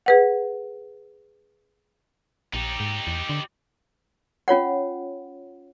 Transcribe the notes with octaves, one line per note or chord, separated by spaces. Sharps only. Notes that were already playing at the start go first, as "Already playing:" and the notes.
G#4 B4 F#5
A#1 D#4 G4
G#2
E2
D3
C#4 F4 C#5 F#5